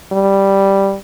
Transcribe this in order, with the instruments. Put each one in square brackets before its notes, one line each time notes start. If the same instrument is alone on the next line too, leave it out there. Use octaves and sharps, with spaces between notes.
[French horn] G3